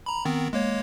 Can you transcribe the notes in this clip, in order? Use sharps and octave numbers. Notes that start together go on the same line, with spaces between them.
A#5 B5
D#3 B3 C4
G#3 A#3 C#5